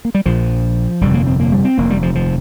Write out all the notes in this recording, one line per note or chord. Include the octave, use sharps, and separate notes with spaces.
A#3
G3
A#1 A#2 F3
G1 F2 C3 G3
A#3
C4
A#3
G3
C4
F1 D#2 A#3
G3
F3
F3